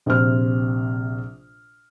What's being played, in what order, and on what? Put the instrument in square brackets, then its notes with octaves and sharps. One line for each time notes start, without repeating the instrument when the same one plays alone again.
[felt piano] A#1 C3 C5 F6